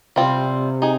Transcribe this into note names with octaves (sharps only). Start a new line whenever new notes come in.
C3 G3 C4 F4
D#4 G#4